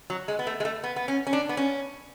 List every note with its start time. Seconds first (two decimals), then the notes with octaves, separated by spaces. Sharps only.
0.10 F#3
0.28 G#3
0.39 B3
0.47 A3
0.60 G#3
0.65 A3
0.84 B3
0.96 B3
1.08 C#4
1.27 C#4
1.33 D4
1.49 B3
1.57 C#4